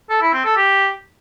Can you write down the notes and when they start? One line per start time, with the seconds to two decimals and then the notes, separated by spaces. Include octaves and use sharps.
0.10 A4
0.22 E4
0.34 C4
0.45 A4
0.57 G4